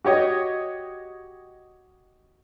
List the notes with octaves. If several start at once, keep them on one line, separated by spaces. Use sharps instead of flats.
F#4 G4 C#5 D#5